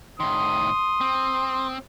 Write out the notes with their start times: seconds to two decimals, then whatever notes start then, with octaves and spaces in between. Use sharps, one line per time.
0.20 A2 D#3 C6 D#6
1.01 C4